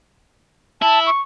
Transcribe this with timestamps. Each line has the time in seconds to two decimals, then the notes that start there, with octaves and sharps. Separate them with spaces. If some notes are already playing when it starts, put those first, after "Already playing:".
0.82 E4 A5
1.07 C#6